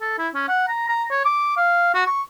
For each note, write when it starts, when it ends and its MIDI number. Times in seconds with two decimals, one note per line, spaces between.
0.01 0.16 69
0.18 0.28 64
0.34 0.45 61
0.48 0.68 78
0.68 0.86 82
0.88 1.05 82
1.11 1.23 73
1.25 1.55 86
1.57 1.92 77
1.94 2.03 66
2.07 2.23 85